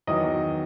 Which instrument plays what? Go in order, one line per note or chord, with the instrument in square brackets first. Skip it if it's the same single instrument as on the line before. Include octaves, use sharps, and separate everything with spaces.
[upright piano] E2 D#3 F#3 D#5